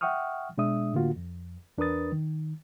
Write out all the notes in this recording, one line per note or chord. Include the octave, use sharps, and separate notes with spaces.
E5 F#5 G5 C#6 D#6 F6
B2 G#3 D4 E5 D#6
A2 D3 A#3 F4 F#4
F2
E2 D4 A#4 B4 D#6 A6
D#3